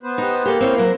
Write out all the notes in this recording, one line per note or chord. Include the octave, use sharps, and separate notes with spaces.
B3 B4 C5
D#4 G4
A#3 G4 A4
C4 E4 C#5 F5
F#3 A#4 C5